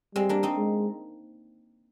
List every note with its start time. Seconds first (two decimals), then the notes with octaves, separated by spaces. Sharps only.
0.15 G3 G#3 C4
0.29 A#3 D4
0.43 C4 D#4
0.58 G#3